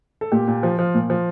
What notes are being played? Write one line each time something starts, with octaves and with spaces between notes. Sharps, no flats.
A4
A#2 G4
A#2
F3
F3
A#2
F3